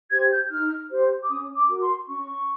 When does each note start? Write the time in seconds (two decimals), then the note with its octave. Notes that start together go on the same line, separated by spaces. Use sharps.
0.11 G4 C5 G#6
0.31 G6
0.50 D#4 F6
0.90 G4 C5
1.22 D6
1.29 C#4 D#6
1.55 D6
1.68 F#4 A#4
1.81 C6
2.07 C#4 C#6